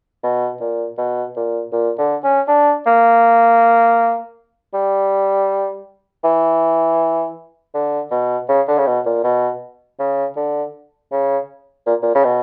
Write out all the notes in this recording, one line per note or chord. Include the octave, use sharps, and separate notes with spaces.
B2
A#2
B2
A#2
A#2
D3
C#4
D4
A#3
G3
E3
D3
B2
C#3
D3
C#3
B2
A#2
B2
C#3
D3
C#3
A#2
A#2
C#3
B2